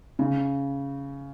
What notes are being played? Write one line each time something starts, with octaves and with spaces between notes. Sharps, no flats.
C#3